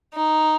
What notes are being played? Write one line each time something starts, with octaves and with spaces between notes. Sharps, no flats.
D#4